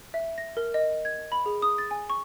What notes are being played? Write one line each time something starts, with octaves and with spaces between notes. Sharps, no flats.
E5
A#6
A#4
D#5
G#6
B5
G#4
D#6
A6
G#5
C#6